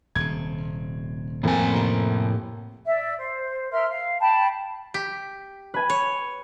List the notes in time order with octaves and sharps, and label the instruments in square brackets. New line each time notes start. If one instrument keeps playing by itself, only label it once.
[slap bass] D#1 C3 [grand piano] G#6
[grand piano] F2 A#3 [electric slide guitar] A2 G#5
[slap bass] C3
[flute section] D5 E5
C5
A#4 E5 C6 F6
F5
G5 A5 B5
[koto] G4 [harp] B6
[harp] B4 G#5
[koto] C#5